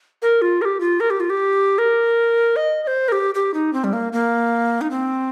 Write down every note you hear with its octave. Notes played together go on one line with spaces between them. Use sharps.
A#4
F4
A#4
G4
F4
A#4
G4
F4
G4
A#4
D#5
D#5
C5
A#4
G4
G4
D#4
C4
G3
A#3
A#3
D#4
C4